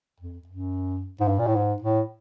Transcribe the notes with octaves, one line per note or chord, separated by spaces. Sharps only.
F2
F#2
G#2
G2
A#2
A2
G#2
A2